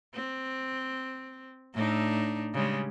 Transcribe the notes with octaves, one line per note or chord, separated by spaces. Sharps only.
C4
A2 D4 D#4
C#3 G3 G#3